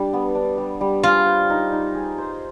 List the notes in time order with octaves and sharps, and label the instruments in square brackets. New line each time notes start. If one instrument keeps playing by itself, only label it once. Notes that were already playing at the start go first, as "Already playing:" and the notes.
Already playing: [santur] G3 D4
B3
D4
G3
G3
[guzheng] F4 [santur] G#4
[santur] C5
D#4
D#4
G#4
C5